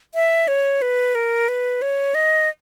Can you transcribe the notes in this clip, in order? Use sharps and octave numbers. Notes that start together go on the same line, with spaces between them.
E5
C#5
B4
A#4
B4
C#5
D#5